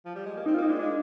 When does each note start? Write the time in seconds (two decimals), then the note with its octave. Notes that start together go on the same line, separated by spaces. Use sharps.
0.05 F3
0.15 G3
0.26 G#3
0.37 A#3
0.46 C4 D#4
0.54 F4
0.58 A#3 D#4
0.68 G#3 D4
0.79 G#3 D4